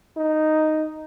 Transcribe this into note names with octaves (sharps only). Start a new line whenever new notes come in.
D#4